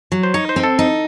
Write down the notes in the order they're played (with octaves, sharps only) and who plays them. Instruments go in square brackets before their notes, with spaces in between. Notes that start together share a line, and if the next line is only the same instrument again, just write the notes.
[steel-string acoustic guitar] F#3
[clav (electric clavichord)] C5
[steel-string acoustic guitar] D#4 [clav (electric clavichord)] C#5
[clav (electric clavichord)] C5
[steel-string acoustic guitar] C4
[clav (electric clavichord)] A4
[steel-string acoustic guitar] D#4